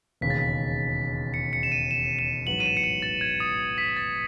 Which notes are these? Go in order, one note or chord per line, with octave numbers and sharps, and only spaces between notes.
E1 D#2 C#3 B6
A6
B6
C#7
C#7
E7
D#7
E7
E7
A1 G#2 F#3 B3 F#4 F#7
D#7
E7
C#7
D#7
A6
G#6
D#6
B6
A6